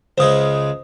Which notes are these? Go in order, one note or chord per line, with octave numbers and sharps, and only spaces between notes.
C#2 C#3 G#3 C5 D#6